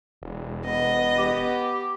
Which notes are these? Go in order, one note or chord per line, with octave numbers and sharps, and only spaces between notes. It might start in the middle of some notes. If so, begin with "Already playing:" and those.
E1
B3 D#5
G4